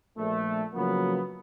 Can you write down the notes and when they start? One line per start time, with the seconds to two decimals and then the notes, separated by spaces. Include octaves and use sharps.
0.17 A#1 A3
0.74 C#3 F3 F#3 A#3 B3